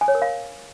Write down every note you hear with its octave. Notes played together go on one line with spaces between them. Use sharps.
G#5
C#5
A#4
F5